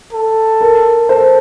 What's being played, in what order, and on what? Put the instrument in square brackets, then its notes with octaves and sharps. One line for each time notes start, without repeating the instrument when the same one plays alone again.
[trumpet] A4
[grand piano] A#4
[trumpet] A4 [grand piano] C5